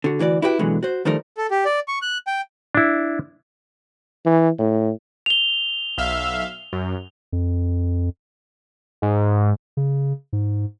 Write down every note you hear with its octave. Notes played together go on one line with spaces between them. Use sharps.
D3 F#4
D2 E3 F#4 D5
E4 F#4 G4 B4 G5
B2 D3 E3 F#3 G#3
F#4 C5
D#3 F3 G3 A3 D#4 A#4
A4
G4
D5
C#6
F#6
G5
D4 E4
E3
A2
F7 G7
B1 E5 F5
F#2
F2
G#2
C#3
G#2